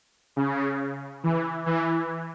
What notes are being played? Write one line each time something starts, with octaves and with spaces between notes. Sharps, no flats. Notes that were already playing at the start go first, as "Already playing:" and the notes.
C#3
E3
E3